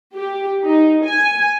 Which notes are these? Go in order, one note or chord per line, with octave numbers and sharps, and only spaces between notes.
G4
D#4
G#5